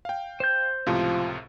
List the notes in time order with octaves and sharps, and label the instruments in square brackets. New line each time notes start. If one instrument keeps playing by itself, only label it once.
[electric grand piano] F5 G5
[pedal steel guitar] C5 G6
[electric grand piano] C#2 A2 C3 [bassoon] F3